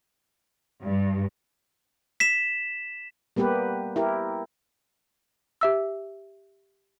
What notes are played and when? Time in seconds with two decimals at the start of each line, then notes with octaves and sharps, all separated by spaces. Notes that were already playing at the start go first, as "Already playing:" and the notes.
0.83 G2
2.20 B6 E7
3.36 G3 A#3 B3 G4 B4
3.96 E4 G4 A#4
5.61 G4 E5 E6